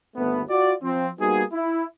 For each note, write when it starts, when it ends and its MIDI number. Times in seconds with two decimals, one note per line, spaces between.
0.16 0.42 31
0.16 0.42 39
0.16 0.42 57
0.16 0.42 59
0.49 0.74 65
0.49 0.74 66
0.49 0.74 74
0.83 1.08 53
0.83 1.08 60
1.19 1.43 55
1.19 1.43 58
1.19 1.43 59
1.19 1.43 63
1.19 1.43 66
1.19 1.43 68
1.53 1.84 64